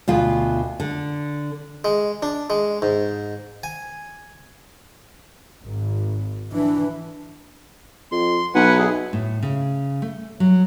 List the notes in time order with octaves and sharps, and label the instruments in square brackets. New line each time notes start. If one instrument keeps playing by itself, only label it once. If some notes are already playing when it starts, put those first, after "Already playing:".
[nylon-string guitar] D2 B2 F4
D3
[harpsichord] G#3
D4
G#3
G#2
G#5
[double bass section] G#1
[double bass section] E3 [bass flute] D4
[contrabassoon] F2 [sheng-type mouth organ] C6
[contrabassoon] B1 [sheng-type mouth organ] B4 F#5 G#5
[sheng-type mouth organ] E4 G#4
[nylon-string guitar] A2
C#3
A3
F#3